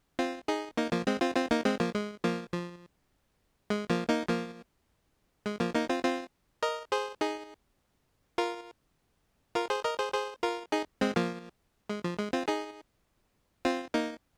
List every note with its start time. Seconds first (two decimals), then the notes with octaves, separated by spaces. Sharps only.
0.19 C4 F4
0.48 D#4 G#4
0.77 A#3 D#4
0.92 F3 A#3
1.07 G#3 C4
1.21 C4 F4
1.36 C4 F4
1.51 A#3 D#4
1.65 G#3 C4
1.80 F3 A#3
1.95 G#3
2.24 F3 A#3
2.53 F3
3.70 G#3
3.90 F3 A#3
4.09 A#3 D#4
4.28 F3 A#3
5.46 G#3
5.60 F3 A#3
5.75 A#3 D#4
5.89 C4 F4
6.04 C4 F4
6.63 A#4 D#5
6.92 G#4 C5
7.21 D#4 G#4
8.38 F4 A#4
9.55 F4 A#4
9.70 G#4 C5
9.84 A#4 D#5
9.99 G#4 C5
10.13 G#4 C5
10.43 F4 A#4
10.72 D#4 G#4
11.01 G#3 C4
11.16 F3 A#3
11.90 G#3
12.04 F3
12.19 G#3
12.33 C4 F4
12.48 D#4 G#4
13.65 C4 F4
13.94 A#3 D#4